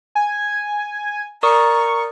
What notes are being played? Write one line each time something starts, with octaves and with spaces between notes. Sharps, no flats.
G#5
A#4 D5 A#5 C#6 D#6